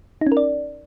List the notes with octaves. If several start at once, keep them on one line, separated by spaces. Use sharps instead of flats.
D#4
C#4
A#4
D5